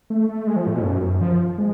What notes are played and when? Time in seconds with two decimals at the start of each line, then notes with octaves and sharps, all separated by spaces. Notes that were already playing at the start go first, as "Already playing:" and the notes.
0.10 A3
0.29 A3
0.47 G#3
0.56 F3
0.67 A2
0.75 B2
0.80 G#2
0.84 F#2
1.02 F#2
1.21 F3
1.58 G#3